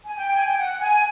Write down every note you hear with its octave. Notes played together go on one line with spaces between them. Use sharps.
G#5
G5
G#5
G5
F#5
G#5